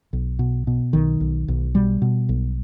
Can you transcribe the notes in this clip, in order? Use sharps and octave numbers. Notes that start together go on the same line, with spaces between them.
B1
B2
B2
B1 D#3
B1
B1
B2 G3
B2
B1